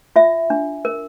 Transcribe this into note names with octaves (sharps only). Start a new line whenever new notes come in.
F4 E5
D4
A#4